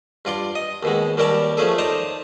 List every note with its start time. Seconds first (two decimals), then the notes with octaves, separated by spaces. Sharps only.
0.25 G2 F4 D5 C6
0.55 D#5
0.83 D#2 B2 G#3
1.17 D#2 G3 C#4 A#4 D5 A5
1.57 F3 A3 C#4 G#4 A4
1.78 D#4 C5 D5 A5 A#5